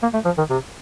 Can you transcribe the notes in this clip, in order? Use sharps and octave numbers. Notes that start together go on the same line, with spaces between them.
A#3
A3
F3
D#3
C3